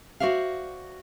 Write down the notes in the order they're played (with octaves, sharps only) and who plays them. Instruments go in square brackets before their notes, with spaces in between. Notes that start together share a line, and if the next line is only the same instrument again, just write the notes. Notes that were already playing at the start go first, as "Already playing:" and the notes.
[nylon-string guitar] F#4 C5 D5 E5 F5